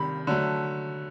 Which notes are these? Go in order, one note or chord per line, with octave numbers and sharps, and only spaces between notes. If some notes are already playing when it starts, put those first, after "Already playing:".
Already playing: C3 D#3 G3 B5
D3 F#3 A3